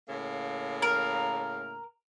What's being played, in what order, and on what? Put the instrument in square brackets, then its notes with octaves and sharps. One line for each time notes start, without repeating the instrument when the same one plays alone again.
[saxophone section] A2 C#3 A#3
[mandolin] A#4